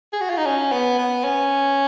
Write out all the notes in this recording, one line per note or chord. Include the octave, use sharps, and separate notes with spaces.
G#4
F#4
F4
D#4
C#4
B3
B3
C#4